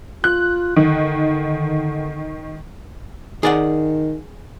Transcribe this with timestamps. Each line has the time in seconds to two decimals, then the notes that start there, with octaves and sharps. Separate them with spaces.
0.24 F4 F#6
0.76 D3 D#3
3.43 D#3 G#4 D5 F#5